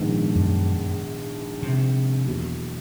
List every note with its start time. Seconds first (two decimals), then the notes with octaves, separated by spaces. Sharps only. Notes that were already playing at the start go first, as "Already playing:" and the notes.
Already playing: A#1 G#2 D#3 G#3 B3
0.36 F#2
1.62 C3
2.26 E2 B2 F#3 A#3